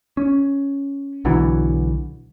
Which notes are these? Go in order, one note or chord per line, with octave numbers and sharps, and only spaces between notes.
C#4
B1 D3 E3 F#3